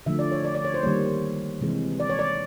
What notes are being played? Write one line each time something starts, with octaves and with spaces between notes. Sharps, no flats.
D3 F3 A3 E5
D5
C#5
D5
D5
C#5
C5
D#3 G3 A#3 C#5
C3 E3 G#3
D5
C#5
D5